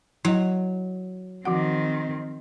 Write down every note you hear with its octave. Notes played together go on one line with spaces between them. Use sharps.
F#3 E4 D#5
D#3 F3 C4 F#4 F#5